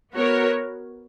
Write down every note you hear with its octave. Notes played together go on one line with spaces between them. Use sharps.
B3 F#4 A#4 C#5